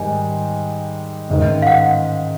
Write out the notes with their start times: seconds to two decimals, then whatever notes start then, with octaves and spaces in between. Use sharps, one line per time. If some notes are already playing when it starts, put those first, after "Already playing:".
Already playing: G#2 D#3 G3 G#5
1.29 A1 G#2 D#3
1.62 F5
1.67 F#5